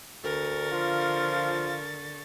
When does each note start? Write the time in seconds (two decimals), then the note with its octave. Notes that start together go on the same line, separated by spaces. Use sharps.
0.24 D2 D3 A#4 C#6 A6
0.72 F3 F4